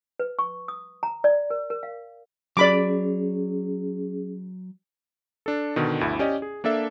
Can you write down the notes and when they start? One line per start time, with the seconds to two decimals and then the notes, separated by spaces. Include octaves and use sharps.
0.19 B4
0.39 C#6
0.68 D#6
1.03 A#5
1.24 D5
1.50 A#4
1.70 A#4
1.83 F5
2.57 F#3 C#4 G#4 D5 B5 D6
5.46 D4 A4
5.76 B2 D3 D#3
6.00 G1 D2 E4
6.19 C#4 G4 D5 D#5
6.42 G#4
6.64 A#3 D4 A4 E5